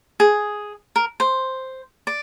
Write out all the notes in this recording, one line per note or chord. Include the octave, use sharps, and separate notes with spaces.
G#4
A#4
C5
D5